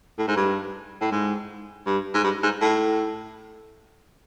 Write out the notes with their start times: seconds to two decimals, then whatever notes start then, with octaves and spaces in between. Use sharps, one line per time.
0.18 A2
0.28 G#2
0.36 G2
1.01 A2
1.12 G#2
1.86 G2
2.14 G#2
2.23 G2
2.43 G#2
2.61 A2